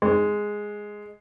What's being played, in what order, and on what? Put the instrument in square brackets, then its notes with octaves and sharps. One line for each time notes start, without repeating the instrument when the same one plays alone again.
[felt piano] G#3